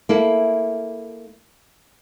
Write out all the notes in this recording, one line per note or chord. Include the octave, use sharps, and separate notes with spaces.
A#3 E4 A4